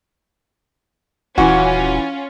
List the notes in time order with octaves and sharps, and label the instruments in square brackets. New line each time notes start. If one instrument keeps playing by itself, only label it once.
[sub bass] D#1 [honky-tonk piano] E3 [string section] C#4 F4 [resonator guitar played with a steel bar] F#4